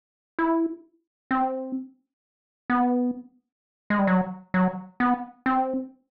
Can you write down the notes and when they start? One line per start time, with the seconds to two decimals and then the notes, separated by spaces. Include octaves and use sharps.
0.39 E4
1.31 C4
2.70 B3
3.90 G#3
3.99 G3
4.07 F#3
4.54 F#3
5.00 B3
5.46 C4